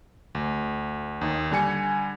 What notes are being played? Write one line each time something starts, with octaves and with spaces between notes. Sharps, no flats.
D2
D#2 D#4
D3 G3 G#5 C#7